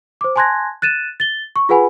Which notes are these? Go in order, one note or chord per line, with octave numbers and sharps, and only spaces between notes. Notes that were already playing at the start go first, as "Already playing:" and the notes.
C5 D6
G#5 A5 C6 F#6 G#6 A#6
F#6 A6 D#7 E7
A6 G7
C#6
F4 G#4 B4 F#5 G#5 B5